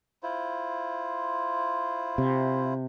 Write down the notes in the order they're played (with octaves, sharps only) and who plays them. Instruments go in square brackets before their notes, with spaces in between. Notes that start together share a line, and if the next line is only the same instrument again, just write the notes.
[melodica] E4 F4 C5
[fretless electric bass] C3